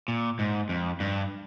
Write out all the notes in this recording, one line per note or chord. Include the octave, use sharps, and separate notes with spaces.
A#2
G#2
F2
G2